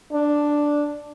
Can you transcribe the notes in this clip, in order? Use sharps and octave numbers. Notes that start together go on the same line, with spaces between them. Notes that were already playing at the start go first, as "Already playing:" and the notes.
D4